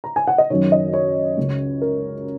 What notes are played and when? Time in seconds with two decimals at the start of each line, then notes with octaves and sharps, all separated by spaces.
0.04 A#5
0.16 G#5
0.27 F#5
0.38 D#5
0.50 F#2 D#3 C#5
0.72 D#5
0.94 C#5
1.37 C#2 C#3
1.81 A#4